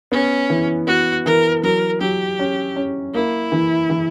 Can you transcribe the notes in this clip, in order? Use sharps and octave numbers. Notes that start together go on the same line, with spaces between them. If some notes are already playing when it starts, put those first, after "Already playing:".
B3 C#4
E3
B3 F#4
E3 A#4
F#3 A#4
F#3 G4
C#4
C#4
A#3 E4
E3
E3